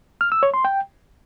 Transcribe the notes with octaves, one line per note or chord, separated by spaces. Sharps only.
F6
E6
C#5
C6
G5